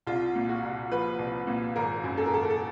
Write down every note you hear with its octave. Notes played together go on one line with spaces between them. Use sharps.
C2 F4
A#2
F#4
C2
F3 B4
C2
A#2
G#1 A#4
F#2
A4
A#4
G#1 A4
A#4
A4